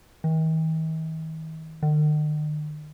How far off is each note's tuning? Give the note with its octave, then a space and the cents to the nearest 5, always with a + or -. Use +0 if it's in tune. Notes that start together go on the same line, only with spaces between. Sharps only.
D#3 +45
D#3 -45